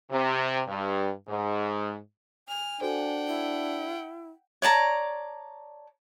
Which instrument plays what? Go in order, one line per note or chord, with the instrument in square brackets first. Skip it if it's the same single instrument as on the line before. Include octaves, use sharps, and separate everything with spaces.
[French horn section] C3
G2
G#2
[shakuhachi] G#5 [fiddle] F6
[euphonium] D4 [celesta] F#4 A4 C5 [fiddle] F#5 G5
[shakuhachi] E4
[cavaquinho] C#5 D5 A5 A#5